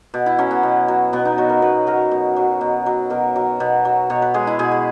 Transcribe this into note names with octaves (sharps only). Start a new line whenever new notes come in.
B2
E4
F#3 C#4
B3
B2
F#3
B2 B3
D#4
F#3 F#4
A#4
B2 B4
F#3 A#4
B2
F#3
B2
F#3
B2 A#4
F#3
B2
F#3
B2 C#5
B4
G#3 G#4
E4
B2 G#4
G#4